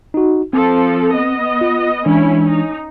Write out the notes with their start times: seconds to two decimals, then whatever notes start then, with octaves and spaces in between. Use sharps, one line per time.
0.14 D#4 F#4
0.53 F3 C4 A4
1.15 B3 D#5
1.61 F4
2.06 E3 G#3 C#4 D4 E4
2.49 D#4